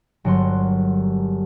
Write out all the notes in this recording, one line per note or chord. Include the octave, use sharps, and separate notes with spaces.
G1 G2 F#3 A#4 F#5 C6